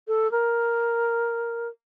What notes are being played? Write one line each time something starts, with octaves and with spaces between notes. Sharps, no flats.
A4
A#4